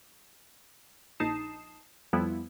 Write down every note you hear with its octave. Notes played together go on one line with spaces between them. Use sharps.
A#1 D#4 A5 D#6 C7 E7
F2 F3 G3 B3 E4